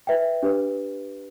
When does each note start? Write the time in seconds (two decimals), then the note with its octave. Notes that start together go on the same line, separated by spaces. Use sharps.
0.07 B4 E5 G5
0.43 D4 G4 B4